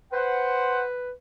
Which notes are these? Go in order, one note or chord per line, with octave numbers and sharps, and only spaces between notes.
B4 C5 F#5